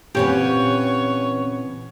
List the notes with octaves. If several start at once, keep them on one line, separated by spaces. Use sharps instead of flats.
A#2 C#3 E3 B3 C4 G4 C#5 G#5